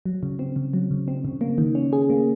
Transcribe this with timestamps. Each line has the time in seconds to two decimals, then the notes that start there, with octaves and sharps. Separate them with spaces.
0.05 F#3
0.23 C#3
0.39 C4
0.56 C#3
0.73 F#3
0.91 C#3
1.08 C4
1.25 C#3
1.41 A#3
1.58 D#3
1.75 C#4
1.93 G#4
2.10 A#3